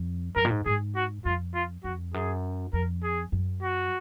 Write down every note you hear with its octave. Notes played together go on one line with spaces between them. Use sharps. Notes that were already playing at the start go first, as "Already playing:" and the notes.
Already playing: F2
F#2 A#4
A#2
G#2
G#2 G#4
F#4
F2 F4
F4
F2 F#4
F#2 G#4
F2 A#4
G#4
F#2
F#4